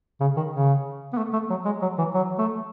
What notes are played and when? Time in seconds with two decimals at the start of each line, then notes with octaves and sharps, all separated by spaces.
0.21 C#3
0.36 D#3
0.53 C#3
1.13 B3
1.18 A3
1.33 A3
1.50 F#3
1.65 G#3
1.82 F#3
1.98 E3
2.14 F#3
2.39 A3